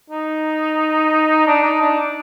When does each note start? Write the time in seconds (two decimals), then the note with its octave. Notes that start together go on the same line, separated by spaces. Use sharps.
0.10 D#4
1.47 D4
1.63 D#4
1.81 D4